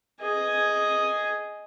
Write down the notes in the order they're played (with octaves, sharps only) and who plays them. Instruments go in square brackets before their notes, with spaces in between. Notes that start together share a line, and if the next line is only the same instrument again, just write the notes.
[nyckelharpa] G#4 D#5